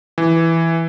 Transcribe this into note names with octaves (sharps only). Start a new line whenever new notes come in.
E3